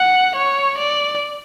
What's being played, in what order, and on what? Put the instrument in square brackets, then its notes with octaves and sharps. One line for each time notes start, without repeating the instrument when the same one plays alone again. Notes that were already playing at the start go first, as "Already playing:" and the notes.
Already playing: [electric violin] F#5
C#5
D5